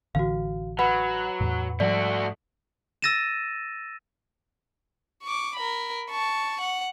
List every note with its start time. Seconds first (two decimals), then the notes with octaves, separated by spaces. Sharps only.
0.15 A1 D3 E3 F#4 F5
0.79 F#3 B4 F#5 B5
1.41 E2 A2
1.80 G#2 F3 G3 A3 F#4 D5
3.02 E6 A6 A#6 D#7 E7
5.23 C#6 D6
5.56 A#4 B5
6.10 A5 C#6
6.61 F#5